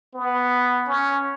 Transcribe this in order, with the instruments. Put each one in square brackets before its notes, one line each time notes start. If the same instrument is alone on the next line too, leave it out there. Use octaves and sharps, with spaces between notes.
[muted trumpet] B3
C#4